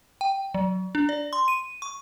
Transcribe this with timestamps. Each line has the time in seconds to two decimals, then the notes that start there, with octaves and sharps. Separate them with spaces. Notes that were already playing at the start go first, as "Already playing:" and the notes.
0.21 G5
0.54 F#3
0.95 D4
1.09 D5
1.33 C6
1.48 D#7
1.82 C#6